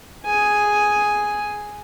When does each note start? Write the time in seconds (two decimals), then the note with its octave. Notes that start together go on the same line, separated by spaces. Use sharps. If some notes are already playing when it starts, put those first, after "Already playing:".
0.24 G#4 G#5